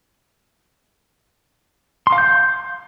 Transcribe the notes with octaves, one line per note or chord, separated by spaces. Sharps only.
C6
F5
G6